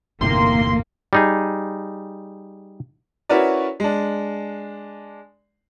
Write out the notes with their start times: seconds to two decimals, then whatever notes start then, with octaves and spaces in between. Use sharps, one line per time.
0.21 G1 E2 A2 C3 D#3 A#3 C6
1.13 G3 D#4 G#4
3.29 C#4 E4 F#4 A#4 B4 D5
3.80 G#3 D4